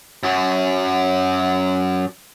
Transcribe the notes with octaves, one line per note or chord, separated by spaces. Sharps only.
F#2 F#3